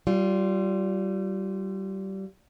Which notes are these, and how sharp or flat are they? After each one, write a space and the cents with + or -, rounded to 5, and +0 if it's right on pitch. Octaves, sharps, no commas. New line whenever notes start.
G3 -25 F4 +0